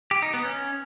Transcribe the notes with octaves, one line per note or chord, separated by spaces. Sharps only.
G4
D#4
B3
C#4